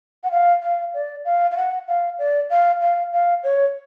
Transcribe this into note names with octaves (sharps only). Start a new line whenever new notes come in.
F#5
F5
F5
D5
F5
F5
F#5
F5
D5
F5
F5
F5
C#5